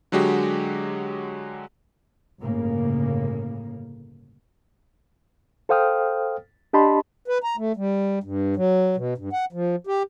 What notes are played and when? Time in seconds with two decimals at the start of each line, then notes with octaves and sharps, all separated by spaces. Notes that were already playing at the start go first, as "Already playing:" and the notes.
0.12 D3 F#3 G#3 F#4 G4
2.41 G1 A2 C#3 A#3
5.69 A4 C5 F5 G5 D#6 F6
6.73 D4 G4 D#5 A5 B5 C6
7.28 B4
7.43 A#5
7.57 A3
7.76 G3
8.24 G2
8.56 F#3
8.96 B2
9.18 G2
9.33 F#5
9.53 F3
9.87 G4